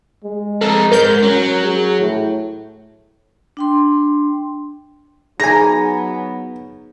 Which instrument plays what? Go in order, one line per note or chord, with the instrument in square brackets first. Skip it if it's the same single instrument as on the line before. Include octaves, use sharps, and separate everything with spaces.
[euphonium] G#3
[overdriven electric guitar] F2 D#4 [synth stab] A4
[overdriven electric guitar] G#2 [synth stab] A#4 G6
[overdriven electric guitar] F#3 [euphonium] C#4
[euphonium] G#4
A2
[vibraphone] D4 G5 C6
[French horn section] F#3 B3 [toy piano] D#4 G#4 E5 [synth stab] G#5 A#5 [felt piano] A#6